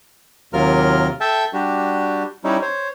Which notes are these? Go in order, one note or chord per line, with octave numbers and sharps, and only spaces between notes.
D#2 C3 F#3 F4 A#4 F6
A4 E5 G5 A5
G3 D4 F#4 G4
G3 C#4 D#4 E4
C5 C#5